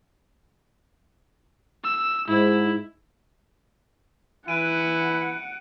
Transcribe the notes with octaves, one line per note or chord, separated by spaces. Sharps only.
E6
G#2 E4
E3 E4 F#5 F#6 D7 D#7